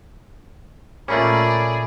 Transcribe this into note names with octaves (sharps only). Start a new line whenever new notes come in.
A#2 A3 A#3 C#4 F4 G#4 D5 B5